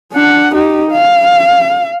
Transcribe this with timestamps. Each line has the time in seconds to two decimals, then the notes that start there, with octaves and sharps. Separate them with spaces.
0.14 D4 F#5
0.55 D#4 G4
0.92 F5